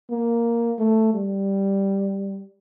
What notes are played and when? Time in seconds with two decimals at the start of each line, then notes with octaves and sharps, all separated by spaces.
0.10 A#3
0.79 A3
1.14 G3